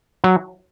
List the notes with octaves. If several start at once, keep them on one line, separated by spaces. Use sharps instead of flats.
F#3